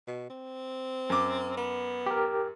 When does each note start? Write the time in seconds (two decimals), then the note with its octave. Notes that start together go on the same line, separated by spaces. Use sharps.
0.07 B2
0.30 C4
1.10 F#2 D6
1.57 B3
2.06 G4 A#4